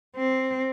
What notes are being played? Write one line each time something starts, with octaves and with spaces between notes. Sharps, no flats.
C4